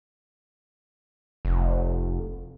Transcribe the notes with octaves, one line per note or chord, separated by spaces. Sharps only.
F1